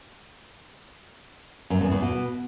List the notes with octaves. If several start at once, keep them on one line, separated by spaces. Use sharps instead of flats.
F#2
E2
E2
B2